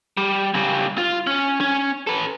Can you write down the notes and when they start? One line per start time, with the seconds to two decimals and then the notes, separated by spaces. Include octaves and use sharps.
0.17 G3
0.54 C#3 G3
0.98 F4
1.27 C#4
1.61 C#4
2.07 A4 B4